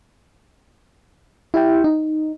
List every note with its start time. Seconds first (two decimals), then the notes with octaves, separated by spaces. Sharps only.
1.54 E4 G4 E5 G5
1.84 D#4